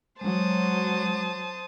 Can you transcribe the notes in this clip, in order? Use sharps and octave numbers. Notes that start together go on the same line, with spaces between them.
F#3 G#3 C5 A5 D#6